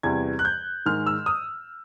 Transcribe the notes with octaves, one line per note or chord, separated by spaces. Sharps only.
E2 C3 E3 G3 G#6
F#6
G6
G#2 D#3 G#3 F6
E6
D#6